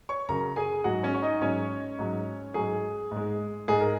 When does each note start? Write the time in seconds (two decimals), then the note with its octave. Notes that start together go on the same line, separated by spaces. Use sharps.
0.09 C#5 C#6
0.29 F#2 C#3 F#3 A#4 A#5
0.56 G#4 G#5
0.84 G#2 F#3 F#4 F#5
1.03 C#4 C#5
1.14 C#5
1.22 D#4 D#5
1.41 G#2 F#3 C#4 C#5
1.99 G#2 F#3
2.54 G#2 F#3 G#4
3.11 G#2
3.17 G#3
3.68 G#2 G#3 G#4
3.81 A#4